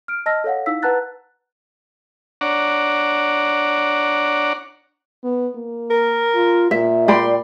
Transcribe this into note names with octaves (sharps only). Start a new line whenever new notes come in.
F6 D7
D#5 A5 E6 F6 A#6
A4 C#5 F5 F#5
D#4 E4 F5 E6 B6
B4 F#5 A5 A#5 F#6 A6
D4 C#5 D5 F#5 A#5
B3
A#3
A#4
F4
A#2 E5
D5 G5 B5 C6